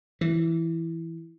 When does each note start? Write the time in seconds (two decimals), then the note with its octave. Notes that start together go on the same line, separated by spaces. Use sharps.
0.21 E3